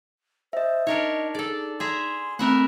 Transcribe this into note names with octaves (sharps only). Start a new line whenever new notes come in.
C5 D#5 E5
D4 D#4 A#4 C#5 D#5
G#4 A4 D5
G#4 E5 A#5 C6
A3 C4 A#4 E5 F#5 B5 F#6